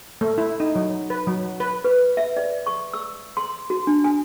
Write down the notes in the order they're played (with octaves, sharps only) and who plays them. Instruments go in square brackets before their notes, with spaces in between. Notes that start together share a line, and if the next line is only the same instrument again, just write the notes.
[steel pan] A3
E4
D#4
F#3
B4
F#3
B4
[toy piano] B4
E5
D5
C#6
E6
C6
F#4
D4
G#5